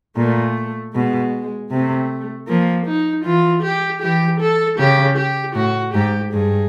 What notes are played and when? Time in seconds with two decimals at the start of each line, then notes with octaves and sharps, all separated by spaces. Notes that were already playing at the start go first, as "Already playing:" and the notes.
0.17 A#2 A3
0.94 B2 G#3
1.71 C3 A3
2.48 F3 A#3
2.86 D#4
3.25 E3 F4
3.63 G4
4.02 E3 G4
4.40 A4
4.79 C#3 G4
5.17 G4
5.55 A2 F#4
5.94 G#2 G4
6.33 G2 G#4